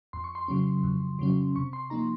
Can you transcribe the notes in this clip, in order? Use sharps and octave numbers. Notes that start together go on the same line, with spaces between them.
F2 C6
C#6
C6
C#3 F#3 C#4
F2
C#3 F#3 C#4
C3 C#6
C6
F3 A#3 D#4 A#5